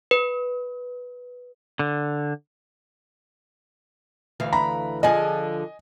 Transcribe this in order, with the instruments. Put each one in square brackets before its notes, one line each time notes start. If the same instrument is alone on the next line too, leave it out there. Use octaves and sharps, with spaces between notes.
[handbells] B4
[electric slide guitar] D3
[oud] D2 E3 F5
[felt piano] A#5 B5
[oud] D3 F3 G#4 [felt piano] D#5 G#5